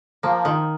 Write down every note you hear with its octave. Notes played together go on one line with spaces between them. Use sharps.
F3 A#3
D#3